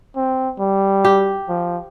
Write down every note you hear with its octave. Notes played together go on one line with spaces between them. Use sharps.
C4
G3
G4
F3